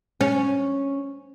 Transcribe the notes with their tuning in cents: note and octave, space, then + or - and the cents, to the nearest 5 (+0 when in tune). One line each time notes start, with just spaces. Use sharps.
C#4 -5